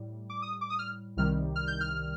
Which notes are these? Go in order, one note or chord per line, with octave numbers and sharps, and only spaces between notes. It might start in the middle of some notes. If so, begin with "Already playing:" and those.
Already playing: A2 G3
D6
D#6
D6
D#6
F6
C2 C3 D#3 G3 F6
F6
G6
F6